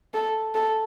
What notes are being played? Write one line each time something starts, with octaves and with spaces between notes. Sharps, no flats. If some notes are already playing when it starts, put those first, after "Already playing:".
A4
A4